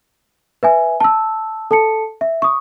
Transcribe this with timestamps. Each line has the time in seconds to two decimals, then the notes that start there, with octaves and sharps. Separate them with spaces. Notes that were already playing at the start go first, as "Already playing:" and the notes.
0.63 B4 E5 G#5
1.00 A5 E6
1.71 A4 A5 C#7
2.21 E5
2.42 C#6 D#6